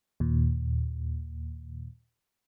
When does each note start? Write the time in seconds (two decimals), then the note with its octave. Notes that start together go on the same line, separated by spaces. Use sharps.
0.20 D#2 A#2